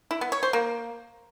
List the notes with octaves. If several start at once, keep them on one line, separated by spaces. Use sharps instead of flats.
E4
B3
C#5
C5
A#3